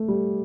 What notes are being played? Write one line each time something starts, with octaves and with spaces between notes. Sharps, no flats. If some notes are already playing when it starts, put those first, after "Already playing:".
Already playing: A3
G3